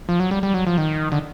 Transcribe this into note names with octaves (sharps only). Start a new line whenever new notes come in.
F3
F#3
G3
G3
F#3
F3
D#3
D3